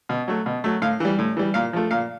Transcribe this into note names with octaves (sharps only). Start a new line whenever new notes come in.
B2
F#3 A3
B2
F#3 A3
A2 F5
E3 G3
A2
E3 G3
A#2 F5
F3 A3
A#2 F5